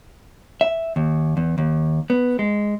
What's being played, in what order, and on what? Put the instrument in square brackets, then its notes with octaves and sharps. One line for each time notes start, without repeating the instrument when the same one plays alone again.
[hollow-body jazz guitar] E5
D#2
E2
D#2
B3
G#3